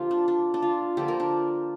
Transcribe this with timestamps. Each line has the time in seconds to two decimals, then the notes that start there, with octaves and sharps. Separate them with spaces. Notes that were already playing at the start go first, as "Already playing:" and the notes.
Already playing: D3 F3 A#3 F4 G4
0.11 D4
0.28 D4
0.54 D4
0.62 F4
0.97 D3 F3 A#3 G4
1.08 A#4
1.20 D4